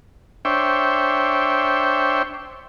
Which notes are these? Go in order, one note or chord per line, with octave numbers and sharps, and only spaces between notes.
D4 C5 C#5 E5 G5